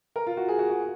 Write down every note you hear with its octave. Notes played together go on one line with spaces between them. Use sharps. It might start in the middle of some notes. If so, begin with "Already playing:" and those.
A#4
F4
F#4
G#4
F#4
F#4